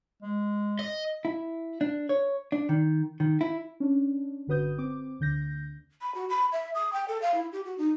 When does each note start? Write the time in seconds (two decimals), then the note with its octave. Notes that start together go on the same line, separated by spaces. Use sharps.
0.22 G#3
0.79 D#5
1.25 E4
1.81 D4
2.09 C#5
2.52 D4
2.69 D#3
3.20 D#3
3.41 E4
3.80 C#4 D4
4.47 G1 D3 F#4 B4 D#6 G6
4.78 C4 D6
5.20 D2 D3 G6 A#6
6.01 B5
6.15 F#4
6.29 B5
6.52 E5
6.75 D#6
6.93 G5
7.08 A4
7.22 F5
7.34 E4
7.52 G4
7.65 F#4
7.78 D#4